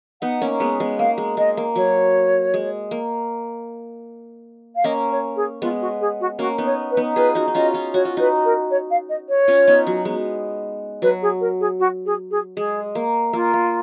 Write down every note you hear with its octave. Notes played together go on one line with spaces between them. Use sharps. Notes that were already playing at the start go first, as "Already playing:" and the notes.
B3 D#4 F#5
A#3 C#4
G#3 B3
G#3 B3
A#3 F5
G#3
G#3 D#5
A#3
F#3 C#5
G#3
A#3
F5
A#3 C#4 D#5
C#5
G#4
G#3 B3 F4
F#4
G#4
F#4
A#3 C#4 F#4
B3 D#4
C#5
B4
B3 D#4
F4 G#4 B4
D#4 F#4
D#4
C#4 F4 D#5
C#4 F4
F#4 C#5
F4
D#4 F#4 B4
A#4
C#5
F5
D#5
C#5
C#4 F4
B3 D#4
F#3
G#3 B3
F#3 B4
G#4
A#4
G#4
F#4
G#4
G#4
G#3 G#4
A#3
A#3 F4
A#3